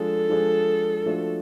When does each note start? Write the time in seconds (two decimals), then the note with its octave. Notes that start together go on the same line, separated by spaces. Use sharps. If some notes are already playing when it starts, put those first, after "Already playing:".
Already playing: F3 G#3 D4 G#4 A4
0.29 F3 G#3 D4 G#4
1.06 F3 A3 D4 F#4